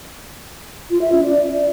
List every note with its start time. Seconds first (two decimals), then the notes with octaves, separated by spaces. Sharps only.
0.91 F4
1.01 E5
1.12 C#4
1.23 D5